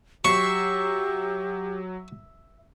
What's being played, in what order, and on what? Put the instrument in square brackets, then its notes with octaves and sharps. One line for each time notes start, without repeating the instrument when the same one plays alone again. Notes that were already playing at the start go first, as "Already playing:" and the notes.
[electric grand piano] F#3 C7 [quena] G4 [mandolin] E5 [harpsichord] C#6